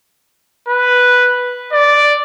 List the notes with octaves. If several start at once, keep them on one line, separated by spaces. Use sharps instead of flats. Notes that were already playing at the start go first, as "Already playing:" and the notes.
B4
D5